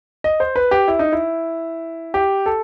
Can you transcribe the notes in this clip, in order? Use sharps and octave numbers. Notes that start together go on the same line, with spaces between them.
D#5
C5
B4
G4
E4
D#4
E4
G4
A4